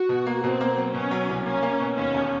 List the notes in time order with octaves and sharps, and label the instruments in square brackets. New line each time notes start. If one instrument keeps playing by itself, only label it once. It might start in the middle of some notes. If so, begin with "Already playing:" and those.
Already playing: [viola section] F#4
[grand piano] B2
A#3
[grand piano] B2 [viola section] C4
[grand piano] A#3
F#3
[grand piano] B2 [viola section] C#4
[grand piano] F#3
C2
[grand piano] A#3 [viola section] C#4
[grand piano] A#3
B2
[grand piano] D#2 [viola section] C#4
[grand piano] E1